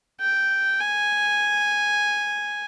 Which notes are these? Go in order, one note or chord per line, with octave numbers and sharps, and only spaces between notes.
G5
G#5